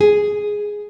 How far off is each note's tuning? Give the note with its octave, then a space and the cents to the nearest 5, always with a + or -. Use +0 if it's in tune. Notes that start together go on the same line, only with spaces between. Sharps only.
G#4 +0